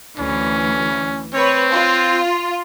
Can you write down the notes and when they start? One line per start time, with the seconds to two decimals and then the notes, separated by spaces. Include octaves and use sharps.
0.19 D2 E3 C#4
1.34 C4 B4 C#5
1.71 F4